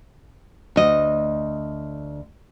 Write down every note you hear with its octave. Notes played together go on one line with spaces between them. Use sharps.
D2 D#5